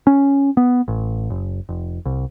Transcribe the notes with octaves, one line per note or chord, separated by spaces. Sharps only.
C#4
B3
A1
F#1
F1
C2